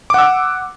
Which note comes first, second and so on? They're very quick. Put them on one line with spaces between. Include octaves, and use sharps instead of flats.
D6 F#5 E6